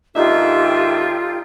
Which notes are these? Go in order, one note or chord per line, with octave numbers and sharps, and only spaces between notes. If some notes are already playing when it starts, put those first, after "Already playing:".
D#2 G#2 D4 D#4 F4 G4 A4 E5